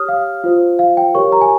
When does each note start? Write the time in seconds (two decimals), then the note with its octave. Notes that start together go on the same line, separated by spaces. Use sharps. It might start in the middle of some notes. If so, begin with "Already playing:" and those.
Already playing: G4 C#5 D#6 F6
0.08 F5
0.44 F4 C5
0.79 F5
0.97 G5
1.14 G4 A#4 C#5 C#6
1.32 A#5
1.41 G#5